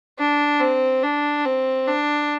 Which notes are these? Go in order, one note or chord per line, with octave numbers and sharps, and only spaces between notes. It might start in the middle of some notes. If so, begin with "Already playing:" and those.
D4
C4
D4
C4
D4